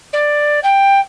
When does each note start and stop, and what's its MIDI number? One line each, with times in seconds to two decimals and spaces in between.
0.13 0.60 74
0.63 1.00 79